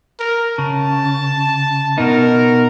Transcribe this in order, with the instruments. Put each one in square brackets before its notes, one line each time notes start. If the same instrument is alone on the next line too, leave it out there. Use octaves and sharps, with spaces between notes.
[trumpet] A#4
[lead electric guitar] C#3 [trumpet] A5
[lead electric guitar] B2 D#4 [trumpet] A#4